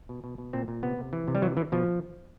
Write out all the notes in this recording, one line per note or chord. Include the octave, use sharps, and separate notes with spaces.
B2
B2
B2
A#2 C4
A#2
C3 B3
C3
E3
C3
G3
E3 F#3
E3
B2 F3